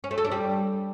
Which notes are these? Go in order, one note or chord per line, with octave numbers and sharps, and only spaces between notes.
C#4
A3
A4
D4
G3